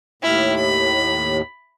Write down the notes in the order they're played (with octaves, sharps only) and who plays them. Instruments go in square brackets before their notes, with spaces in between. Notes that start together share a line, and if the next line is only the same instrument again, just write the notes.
[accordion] D#2 A2 [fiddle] E4 F6
[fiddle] B5